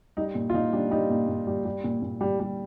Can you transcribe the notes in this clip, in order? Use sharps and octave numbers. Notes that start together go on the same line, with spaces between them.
G3 D#4
A#2
F4
A#2 D#4
G3 D4
G3 D#4
A#2
A#2
G3
G3
A#2
A#2
G3
G3